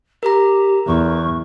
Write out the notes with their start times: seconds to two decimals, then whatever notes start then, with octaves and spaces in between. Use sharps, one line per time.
0.23 G4 A#4 A#5
0.87 E2 C#6